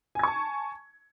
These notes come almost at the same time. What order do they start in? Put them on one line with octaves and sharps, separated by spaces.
G#5 G#6 C#6 A5